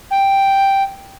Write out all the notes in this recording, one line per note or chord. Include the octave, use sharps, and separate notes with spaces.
G5